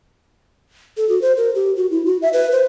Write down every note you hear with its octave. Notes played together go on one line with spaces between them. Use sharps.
A4
F#4
C5
A#4
G4
F#4
E4
F#4
E5
B4
C5